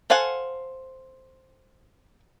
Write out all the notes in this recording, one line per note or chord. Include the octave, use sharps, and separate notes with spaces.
A4 C5 F5 F#5 G#5